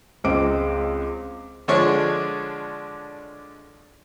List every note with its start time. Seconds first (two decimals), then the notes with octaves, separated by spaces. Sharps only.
0.24 C#2 G#3 C4 D#5 D6 D7
1.68 D3 F3 G#3 D4 C#5 C#6